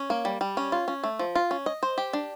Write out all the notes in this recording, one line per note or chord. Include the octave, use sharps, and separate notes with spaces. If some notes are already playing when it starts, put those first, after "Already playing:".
Already playing: C#4
A#3
G3
G3
C#4
F4
C#4
A3
F3
F4
C#4
D#5
C5
G4
D4